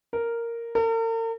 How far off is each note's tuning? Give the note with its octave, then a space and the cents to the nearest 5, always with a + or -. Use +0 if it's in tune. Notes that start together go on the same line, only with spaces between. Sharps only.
A#4 -5
A#4 -45